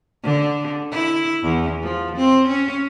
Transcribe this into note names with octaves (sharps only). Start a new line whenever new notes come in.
D3
E4
E2
F3
C4
C#4